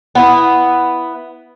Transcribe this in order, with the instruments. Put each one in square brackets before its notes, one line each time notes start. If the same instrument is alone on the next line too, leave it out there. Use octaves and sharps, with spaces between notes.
[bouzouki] B3 E4